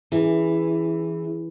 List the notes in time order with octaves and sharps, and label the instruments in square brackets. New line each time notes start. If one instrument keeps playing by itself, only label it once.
[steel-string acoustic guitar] E3 [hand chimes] C#4 E4 G#4